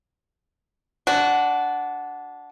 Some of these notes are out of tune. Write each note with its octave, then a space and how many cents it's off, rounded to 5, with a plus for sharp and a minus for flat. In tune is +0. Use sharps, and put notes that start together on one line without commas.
D4 -15 F#4 +0